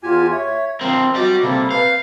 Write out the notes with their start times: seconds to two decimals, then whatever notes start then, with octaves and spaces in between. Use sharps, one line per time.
0.03 E2 F4 G4 G#5
0.32 C#5 E5
0.81 F3 C4 A#4 C5 G5
1.15 F#4 G4 D5 D#5
1.43 C3 G3 A#3 A4 B5
1.71 B4 F5 G6